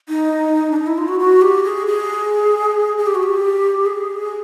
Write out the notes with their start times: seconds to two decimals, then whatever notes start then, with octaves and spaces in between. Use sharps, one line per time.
0.09 D#4
0.71 D4
0.76 D#4
0.87 E4
0.98 F4
1.08 F#4
1.19 F#4
1.42 G4
1.64 G#4
1.87 G#4
2.98 G#4
3.07 G4
3.15 F#4
3.23 G4
3.86 G#4